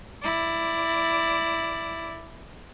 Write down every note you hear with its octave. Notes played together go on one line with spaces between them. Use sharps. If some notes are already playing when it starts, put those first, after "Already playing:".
E4 D5